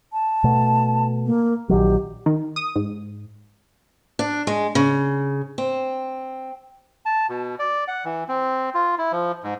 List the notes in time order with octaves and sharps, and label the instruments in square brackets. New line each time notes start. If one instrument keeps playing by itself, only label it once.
[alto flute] A5
[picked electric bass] B2 A3
[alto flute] A#3
[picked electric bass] A#1 D#3 F#3 [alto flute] G4
[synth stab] D#3
D#6
G#2
[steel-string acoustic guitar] D4
G#3
C#3
C4
[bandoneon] A5
B2
D5
F#5
E3
C4
F4
E4
F3
G#2